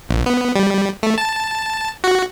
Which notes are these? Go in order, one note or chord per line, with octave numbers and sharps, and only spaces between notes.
A#1
B3
G3
A3
A5
F#4